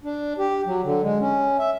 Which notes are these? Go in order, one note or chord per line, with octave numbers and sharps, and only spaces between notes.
D4
G4
F#3
D3
G#3
C#4
E5